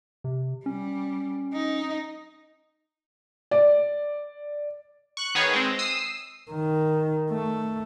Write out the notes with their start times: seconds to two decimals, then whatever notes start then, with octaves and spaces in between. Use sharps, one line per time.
0.24 C3
0.66 G3 C#4
1.54 D#4
3.51 D5
5.17 C#6 F#6
5.35 D#3 B3 G#4 B4 C#5
5.53 G#3 C4
5.79 D#6 E6 C7
6.51 D#3
7.31 A3